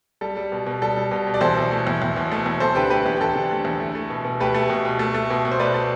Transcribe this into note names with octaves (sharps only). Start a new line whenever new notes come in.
G3 A4
G3
B2
B2
G3 A4
G3
B2
B2
D5
E2 A4 C5
B2
A3
E2
E2
B2
A3
E2
E2 A4 C5
D3 G4 B4
A3 G4 B4
E2 G4
G4
E2 A4
D3
A3
E2
A3
A3
B2
B2
A3 G4 B4
A3
B2
B2
A3
A3
B2
B2
C5
A3 B4 D5
A3